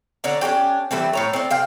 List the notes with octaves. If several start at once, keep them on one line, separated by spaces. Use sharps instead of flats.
D3 C#5 D5 A#5
C#4 D4 F#4 G4
E3 G3 A3 C4
A2 C#5 A#5
C4 D5
C3 F5 G5